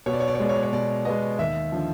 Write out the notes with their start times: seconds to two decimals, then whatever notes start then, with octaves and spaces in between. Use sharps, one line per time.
0.06 B2 C#5
0.13 D5
0.20 C#5
0.28 D5
0.35 C#5
0.40 G#3 B3 D5
0.49 C#5
0.56 D5
0.63 C#5
0.73 B2 D5
1.05 G#3 B3 D#5
1.39 D#2 E5
1.72 D3 F3